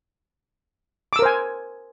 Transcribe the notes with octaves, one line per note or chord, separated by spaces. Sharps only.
A#4 C5 G#5 D6 E6